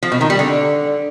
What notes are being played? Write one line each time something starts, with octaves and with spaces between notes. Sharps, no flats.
F3
B2
D#3
G3
D3